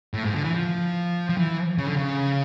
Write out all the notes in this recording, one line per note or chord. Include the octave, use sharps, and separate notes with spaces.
A2
G#2
D3
E3
F3
F3
E3
C#3
D3
C#3